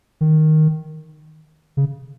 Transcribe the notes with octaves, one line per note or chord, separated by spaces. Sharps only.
D#3
C#3